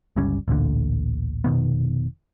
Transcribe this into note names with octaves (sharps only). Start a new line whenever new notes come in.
G1 C#2 G3 C#4
A1 D2 A#2 D3
F1 B2 D#3 B3